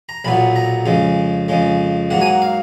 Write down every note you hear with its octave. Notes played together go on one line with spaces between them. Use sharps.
A#5
B1 A#2 F#3 B3 B5
A#5
F2 C#3 G#3
F2 C#3 G#3
G#2 F#3 A#3 F#5
G#5
F#5
F5